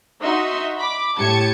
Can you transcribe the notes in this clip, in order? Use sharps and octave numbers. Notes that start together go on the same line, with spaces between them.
D#4 F#4 E5 C6
B5 D6
A2 G4 A5 G#6 C#7